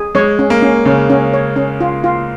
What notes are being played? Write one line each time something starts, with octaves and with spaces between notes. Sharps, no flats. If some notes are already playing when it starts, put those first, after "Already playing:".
Already playing: G#4
G#3 C#5
C#4
A#3
C#4
C#3 C#4
C#4
C#5
C#4
F4
F4